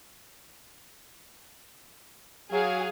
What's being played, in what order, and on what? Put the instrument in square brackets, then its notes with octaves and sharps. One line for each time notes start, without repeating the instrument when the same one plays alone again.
[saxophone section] F#3 [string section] G#4 F5